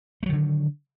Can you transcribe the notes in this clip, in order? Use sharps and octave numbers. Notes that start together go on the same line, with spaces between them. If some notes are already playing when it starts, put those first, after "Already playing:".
D3 D#3 F#3 A3